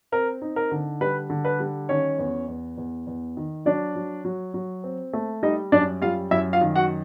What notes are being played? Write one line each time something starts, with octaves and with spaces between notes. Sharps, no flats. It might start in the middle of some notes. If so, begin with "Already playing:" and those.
C4 A#4
D#4
A#4
D3
G3 B4
D3
B4
G3
D#3 C#4 C#5
E2
E2
E2
E2
D#3
F#3 D4 D5
F#3
F#3
F#3
C4
A3
G3 D#4 D#5
F#2 D4 D5
G3 F4 F5
F#2 E4 E5
F4 F5
D#3
F#4 F#5